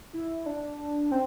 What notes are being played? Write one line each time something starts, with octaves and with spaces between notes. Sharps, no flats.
E4
D4
C4